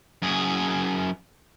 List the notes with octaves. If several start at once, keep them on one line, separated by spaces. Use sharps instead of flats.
F#2 G#4